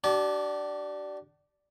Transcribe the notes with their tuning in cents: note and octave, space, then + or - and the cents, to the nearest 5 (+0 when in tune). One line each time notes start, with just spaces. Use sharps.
D4 +0 G4 -45 A5 -35